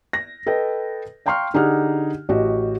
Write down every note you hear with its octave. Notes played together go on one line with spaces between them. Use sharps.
A#6
A4 B4 D#5 G5
F5 G5 A#5 C6 C#6 F6
D3 D#4 G4 G#4 F#5 F6
A1 F#4 G4 D#5